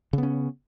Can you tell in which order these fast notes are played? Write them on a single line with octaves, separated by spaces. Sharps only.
C#3 B3 C#4